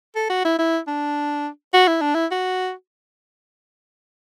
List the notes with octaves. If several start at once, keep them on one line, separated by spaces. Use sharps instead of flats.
A4
F#4
E4
E4
D4
F#4
E4
D4
E4
F#4